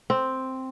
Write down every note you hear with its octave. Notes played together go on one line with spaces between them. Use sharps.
C4